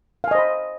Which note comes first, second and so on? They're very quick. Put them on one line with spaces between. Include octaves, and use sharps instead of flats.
F5 G#5 D#5 C5 B5